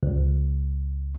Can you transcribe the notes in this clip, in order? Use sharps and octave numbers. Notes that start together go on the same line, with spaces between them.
C#2